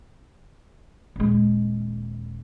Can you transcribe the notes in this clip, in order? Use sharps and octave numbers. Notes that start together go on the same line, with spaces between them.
D#1 G#3